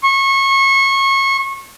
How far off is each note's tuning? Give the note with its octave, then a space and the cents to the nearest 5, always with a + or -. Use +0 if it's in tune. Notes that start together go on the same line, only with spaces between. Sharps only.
C#6 -25